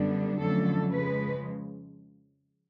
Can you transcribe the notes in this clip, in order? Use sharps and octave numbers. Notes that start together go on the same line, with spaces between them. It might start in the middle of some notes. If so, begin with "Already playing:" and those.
Already playing: F#2 D3 G3 B3 D4
F2 D3 F#3 A3 C#4 A4
C#3 F3 G#3 B4